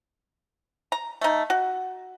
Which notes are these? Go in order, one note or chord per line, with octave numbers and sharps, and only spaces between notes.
A#5
A3 D#4
F#4